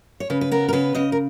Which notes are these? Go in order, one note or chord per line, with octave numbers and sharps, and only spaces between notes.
C#5
C#3 B4
B4
B3 A#4
A#4
C#3 B4
C#3 D#5
A#4